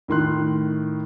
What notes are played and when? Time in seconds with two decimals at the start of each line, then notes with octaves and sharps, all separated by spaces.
0.08 A2 D#3 C6 F#6